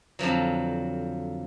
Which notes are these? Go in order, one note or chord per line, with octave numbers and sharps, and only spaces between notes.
F2 D3 F3 F#3